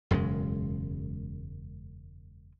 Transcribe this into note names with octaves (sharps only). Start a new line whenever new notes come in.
E1 F#2 C#3 G#3